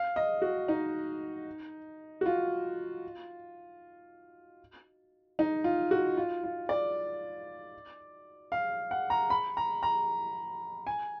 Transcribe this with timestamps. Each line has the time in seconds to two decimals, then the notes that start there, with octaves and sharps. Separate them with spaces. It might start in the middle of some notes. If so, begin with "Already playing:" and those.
Already playing: F5
0.16 D#5
0.42 F#4
0.68 D#4
2.21 F#4
2.26 F4
5.39 D#4
5.64 F4
5.91 F#4
6.17 F4
6.43 F4
6.69 D5
8.52 F5
8.91 F#5
9.10 A#5
9.30 B5
9.57 A#5
9.83 A#5
10.87 G#5